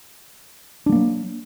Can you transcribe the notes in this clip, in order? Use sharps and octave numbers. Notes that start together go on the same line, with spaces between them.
F#3 G3 A#3 D4